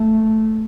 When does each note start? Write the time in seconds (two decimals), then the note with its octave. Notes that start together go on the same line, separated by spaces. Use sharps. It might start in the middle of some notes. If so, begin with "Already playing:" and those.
Already playing: A3